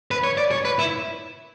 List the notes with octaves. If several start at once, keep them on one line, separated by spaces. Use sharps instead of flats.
B4
C#5
D5
C#5
B4
E4